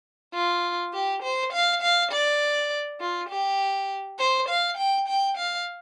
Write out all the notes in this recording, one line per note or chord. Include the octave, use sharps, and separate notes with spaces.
F4
G4
C5
F5
F5
D5
F4
G4
C5
F5
G5
G5
F5